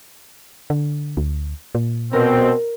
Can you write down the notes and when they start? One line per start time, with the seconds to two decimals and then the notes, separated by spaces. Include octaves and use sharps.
0.70 D3
1.17 D2
1.75 A#2
2.13 B2 C4 A#4